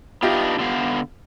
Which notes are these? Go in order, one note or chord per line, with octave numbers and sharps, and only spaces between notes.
B3 D4 D#4 F4 G4 E5
D3 B3 F5